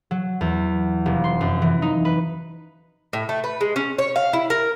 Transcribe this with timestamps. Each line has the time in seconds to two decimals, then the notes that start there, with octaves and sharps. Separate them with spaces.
0.11 F#3
0.41 E2
1.06 F1
1.24 C6
1.41 F#2
1.62 E3
1.82 D#4
2.05 B4
3.13 A2
3.29 A3
3.44 B4
3.61 G#3
3.76 C#4
3.99 C#5
4.16 F5
4.33 E4
4.50 A#4